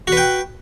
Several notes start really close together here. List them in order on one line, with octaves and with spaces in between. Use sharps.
F#4 B4 G5